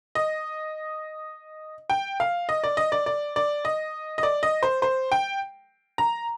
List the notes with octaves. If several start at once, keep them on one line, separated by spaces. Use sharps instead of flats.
D#5
G5
F5
D#5
D5
D#5
D5
D5
D5
D#5
D#5
D5
D#5
C5
C5
G5
A#5